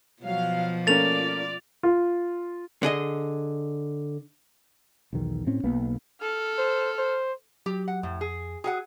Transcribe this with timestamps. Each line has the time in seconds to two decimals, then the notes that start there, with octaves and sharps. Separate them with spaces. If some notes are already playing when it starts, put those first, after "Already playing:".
0.23 B2 F3 F#3 F5
0.87 A3 A#3 C#4 F4 D5 A6 F7
1.83 F4
2.83 D3 G#4 D#5
5.13 B1 E2 D#3
5.47 A2 C4 C#4
5.63 B1 A#3 B3
6.21 A4 F6
6.58 C5
6.99 C5
7.66 F#3 G4
7.88 F#5
8.03 F2 A2
8.21 G#4
8.64 F#4 G#4 A4 F#5 G5 D#6